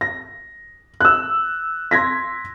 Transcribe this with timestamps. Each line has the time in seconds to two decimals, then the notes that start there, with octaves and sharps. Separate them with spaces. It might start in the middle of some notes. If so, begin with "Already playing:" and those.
0.01 A#6
1.01 E6 F#6
1.91 C6 G#6 A#6 B6